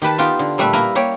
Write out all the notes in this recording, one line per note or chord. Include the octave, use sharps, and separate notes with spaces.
D#3 G4 B4 A5
B3 D#4 F4 G4
D3
A#2 G3 A3 B4 E5
A#3 E4 A#4 B4
A#3 G4 C#5